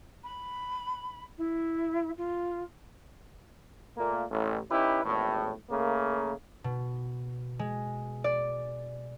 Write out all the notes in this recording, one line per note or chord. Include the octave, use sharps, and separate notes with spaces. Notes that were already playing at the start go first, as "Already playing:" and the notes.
B5
E4
F4
A#2 A3 A#3
A1
C#4 D#4 E4 G4 B4
G#1 E2 A2
C#3 A3 A#3
B2
G#3
D5